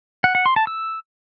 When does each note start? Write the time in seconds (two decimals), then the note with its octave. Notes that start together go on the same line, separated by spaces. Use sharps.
0.24 F#5
0.35 F#5
0.46 C6
0.56 A5
0.67 E6